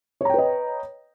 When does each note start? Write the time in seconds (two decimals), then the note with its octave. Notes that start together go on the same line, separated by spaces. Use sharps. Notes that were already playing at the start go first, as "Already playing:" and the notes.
0.21 C#5
0.25 A#5
0.30 G5
0.34 B4
0.38 D#5